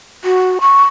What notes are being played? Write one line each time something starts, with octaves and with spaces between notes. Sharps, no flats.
F#4
C#6